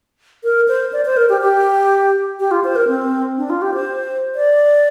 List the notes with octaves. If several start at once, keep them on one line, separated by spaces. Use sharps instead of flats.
A#4
C5
D5
C5
A#4
G4
G4
G4
F4
C5
A#4
C4
D4
F4
G4
C5
D5